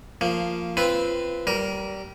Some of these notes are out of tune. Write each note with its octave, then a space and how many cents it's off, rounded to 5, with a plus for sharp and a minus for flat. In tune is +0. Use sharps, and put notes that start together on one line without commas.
F3 -5 A#3 -20
C4 +0 F4 -25 B4 +0
G3 -20 A#4 +0